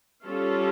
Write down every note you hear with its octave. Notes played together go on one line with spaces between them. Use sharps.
G3 C#4 F4 A4